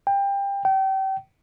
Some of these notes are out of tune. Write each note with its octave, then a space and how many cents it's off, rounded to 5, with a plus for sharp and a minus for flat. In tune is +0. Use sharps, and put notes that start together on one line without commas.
G5 +25
G5 -30